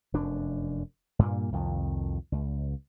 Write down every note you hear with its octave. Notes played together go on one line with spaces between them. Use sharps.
F1 F#2 D4
G2 A#2 A#3
C2 F2 D#3
C#2